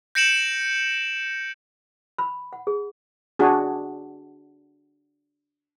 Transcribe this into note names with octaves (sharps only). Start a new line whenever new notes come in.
G6 A#6 C#7 D7 E7 F#7
B5
F#5
G#4
D4 F#4 G#4